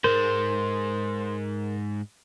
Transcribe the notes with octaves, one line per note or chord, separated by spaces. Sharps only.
G#2 G#3 A#4 C5